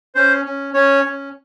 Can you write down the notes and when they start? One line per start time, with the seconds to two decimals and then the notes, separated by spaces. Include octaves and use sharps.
0.15 C#4 C5
0.45 C#4
0.74 C#4 C#5
1.04 C#4